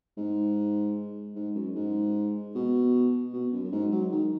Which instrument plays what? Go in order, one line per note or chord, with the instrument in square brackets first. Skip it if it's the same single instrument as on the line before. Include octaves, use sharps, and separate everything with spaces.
[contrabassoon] G#2
G#2
F#2
G#2
B2
B2
F#2
F#2
G#2
F#3
D#3